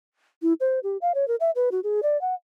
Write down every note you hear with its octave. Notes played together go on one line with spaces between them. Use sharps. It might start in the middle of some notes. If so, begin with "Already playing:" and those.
E4
C5
G4
F5
C#5
A#4
E5
B4
F#4
G#4
D5
F#5